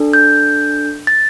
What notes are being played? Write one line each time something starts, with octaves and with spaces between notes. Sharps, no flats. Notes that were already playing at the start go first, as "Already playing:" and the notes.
Already playing: D4 A4
G6
A6